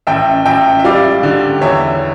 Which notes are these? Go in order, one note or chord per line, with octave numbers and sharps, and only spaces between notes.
A1 E5 G5
A1 E5 G5
E5
G3 D5 F5
D3
E2 C#5 E5